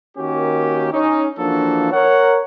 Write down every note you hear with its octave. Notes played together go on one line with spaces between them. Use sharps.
D#3 A#3 C#4 F#4 G4
C#4 D#4
E3 F3 A#3 D4 F#4 A4
A#4 C#5 F#5